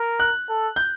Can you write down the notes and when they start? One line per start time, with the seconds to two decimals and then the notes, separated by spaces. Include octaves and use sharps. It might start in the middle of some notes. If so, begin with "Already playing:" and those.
Already playing: A#4
0.20 F#6
0.49 A4
0.76 G6